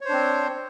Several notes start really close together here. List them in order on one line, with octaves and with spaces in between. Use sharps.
C#5 C5 D4 C4